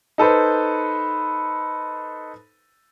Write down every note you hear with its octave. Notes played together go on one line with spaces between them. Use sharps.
D#4 A4 B4 C5